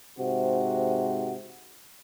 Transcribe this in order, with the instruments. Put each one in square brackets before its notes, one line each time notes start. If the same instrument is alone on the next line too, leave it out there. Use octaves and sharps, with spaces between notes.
[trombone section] G#2 C3 C4 F#4